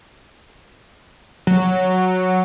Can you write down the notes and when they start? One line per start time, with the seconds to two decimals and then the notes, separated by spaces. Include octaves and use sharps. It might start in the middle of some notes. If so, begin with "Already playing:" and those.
1.47 F#3